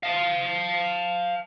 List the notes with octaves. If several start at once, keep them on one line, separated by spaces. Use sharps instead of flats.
F5 A5